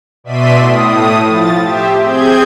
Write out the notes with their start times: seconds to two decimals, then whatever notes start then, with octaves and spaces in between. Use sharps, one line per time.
0.24 B2 D5 E5 C6 B6 D#7
0.56 A2 D#6
1.26 F3 A6
1.61 G4 C5 E5
2.00 C4 G#4 G6 G#6